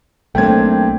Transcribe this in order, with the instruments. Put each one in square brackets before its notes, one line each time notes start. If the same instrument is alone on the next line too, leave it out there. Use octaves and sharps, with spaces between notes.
[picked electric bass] B1 A#3 [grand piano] A3 C4 D4 [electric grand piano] G5 G#6